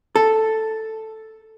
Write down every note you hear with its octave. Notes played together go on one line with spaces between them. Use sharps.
A4